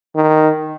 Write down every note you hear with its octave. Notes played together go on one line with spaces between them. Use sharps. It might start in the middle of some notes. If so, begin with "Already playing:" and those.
D#3